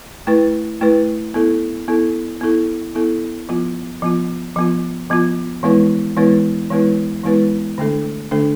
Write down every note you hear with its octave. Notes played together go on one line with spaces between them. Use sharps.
A3 E4 B4
A3 E4 B4
B3 E4 A4
B3 E4 A4
B3 E4 A4
B3 E4 A4
F3 B3 F4
F3 B3 F4
F3 B3 F4
F3 B3 F4
E3 G#3 B3 E4 B4
E3 G#3 B3 E4 B4
E3 G#3 B3 E4 B4
E3 G#3 B3 E4 B4
D3 A3 D4 A4
D3 A3 D4 A4